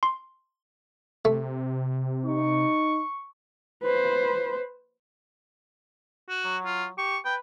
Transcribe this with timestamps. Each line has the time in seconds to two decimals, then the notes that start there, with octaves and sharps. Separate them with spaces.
0.03 C6
1.25 C3 A3
2.25 D#4 C#6
3.83 B4 C5
6.29 F#4
6.45 F#3
6.65 F4
6.98 G4 C#6
7.25 B4 G5